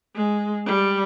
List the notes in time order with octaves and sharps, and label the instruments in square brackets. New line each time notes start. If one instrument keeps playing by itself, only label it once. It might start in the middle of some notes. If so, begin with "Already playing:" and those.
[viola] G#3
G3